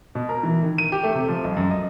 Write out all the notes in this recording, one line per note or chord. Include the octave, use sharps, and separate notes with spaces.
B2
A#4
E3
D#3
D#7
G4
A3
C3
F3
B1
F#2
D#5